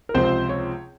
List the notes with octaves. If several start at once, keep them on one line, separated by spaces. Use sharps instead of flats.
A#4
C#2 C3 F3 G#3 C4 C5
C#5